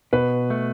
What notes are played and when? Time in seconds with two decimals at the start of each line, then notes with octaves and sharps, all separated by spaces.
0.13 B2 B4
0.50 A3